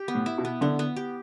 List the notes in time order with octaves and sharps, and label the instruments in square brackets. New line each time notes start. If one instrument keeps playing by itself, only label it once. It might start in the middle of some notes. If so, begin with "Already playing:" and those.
Already playing: [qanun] G4
B3
[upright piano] A2
[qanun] E4
[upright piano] B2
[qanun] B3
[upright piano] D3 [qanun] B3
[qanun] B3
G4